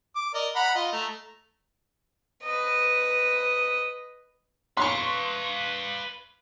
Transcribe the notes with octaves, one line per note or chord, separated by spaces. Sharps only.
D6
A#4 D5 D#5
F#5 A#5 B5
F4 D#5
A3 A#5
B4 D#5
B4 F5 C6 C#6